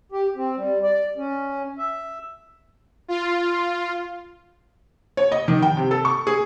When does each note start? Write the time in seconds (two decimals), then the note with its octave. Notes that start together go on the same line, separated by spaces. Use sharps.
0.12 G4
0.36 C4
0.57 G3
0.83 D5
1.17 C#4
1.78 E5
3.08 F4
5.17 C#5
5.32 D#5
5.48 D#3
5.62 G5
5.77 C3
5.91 A4
6.05 C#6
6.27 G#4